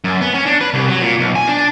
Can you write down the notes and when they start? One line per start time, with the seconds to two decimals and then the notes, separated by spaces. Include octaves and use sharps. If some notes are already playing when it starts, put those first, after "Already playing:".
0.04 F#2
0.21 B3
0.34 C#4
0.46 D4
0.61 B4
0.74 C2
0.88 F#3
1.02 A#2
1.19 B1
1.35 G#5
1.48 D4